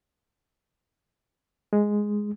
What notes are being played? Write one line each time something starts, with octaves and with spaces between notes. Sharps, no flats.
G#3